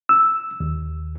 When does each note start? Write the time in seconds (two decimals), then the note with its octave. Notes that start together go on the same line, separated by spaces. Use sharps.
0.09 E6
0.60 D#2